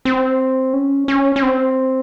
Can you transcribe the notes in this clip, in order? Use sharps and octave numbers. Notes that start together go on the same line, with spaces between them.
C4
C#4
C#4
C#4
C4